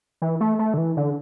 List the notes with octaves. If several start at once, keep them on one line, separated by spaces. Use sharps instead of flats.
E3
A3
A3
D3
E3
D3